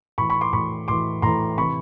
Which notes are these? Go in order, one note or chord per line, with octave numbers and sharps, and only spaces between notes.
A2 E3 B5 C#6
B5 C#6
C6 D6
A2 E3 B5 C#6
A2 E3 C6 D6
A2 E3 A#5 C6
C3 E3 B5 C#6